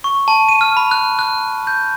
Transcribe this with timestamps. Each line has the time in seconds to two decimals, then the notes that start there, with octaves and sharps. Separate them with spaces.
0.04 C#6
0.28 A5
0.49 D#7
0.61 F6
0.77 B5
0.91 F#6
1.19 F#6
1.67 G6